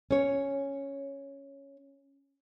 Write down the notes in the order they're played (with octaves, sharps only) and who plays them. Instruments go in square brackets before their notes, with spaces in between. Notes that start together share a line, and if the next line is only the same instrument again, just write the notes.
[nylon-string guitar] C#4 C#5